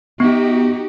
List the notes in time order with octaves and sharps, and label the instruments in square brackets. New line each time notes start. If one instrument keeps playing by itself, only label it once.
[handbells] B3 [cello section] D#4 F#4 G4